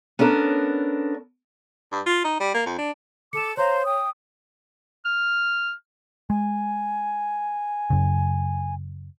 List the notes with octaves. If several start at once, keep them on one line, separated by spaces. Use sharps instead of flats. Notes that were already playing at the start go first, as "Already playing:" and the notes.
B3 C#4 D4 A4 A#4
G2
F4
D#4
G3
A#3
F2
D4
A4 D6 C#7 E7
C5 C#5 F5 A#5
G5 D#6
F6
G#3 G#5
F#2 C#3